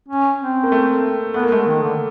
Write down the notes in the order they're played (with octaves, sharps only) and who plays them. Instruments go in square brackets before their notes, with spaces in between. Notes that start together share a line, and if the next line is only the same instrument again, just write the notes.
[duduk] C#4
C4
[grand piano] A#3
A3
[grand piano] A3 [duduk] B3
[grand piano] A#3
[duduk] G#3 [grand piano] A3
[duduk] D#3 [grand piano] A#3
[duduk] D3